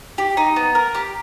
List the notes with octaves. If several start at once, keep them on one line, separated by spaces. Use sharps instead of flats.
G4
D#4
B3
A#4
G4